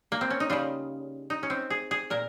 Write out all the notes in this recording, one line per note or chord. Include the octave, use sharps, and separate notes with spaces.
A#3
C4
C#4
D#4
C#3 G3 F4
D#4
C#4
C4
G#4
G#4
A#2 A#4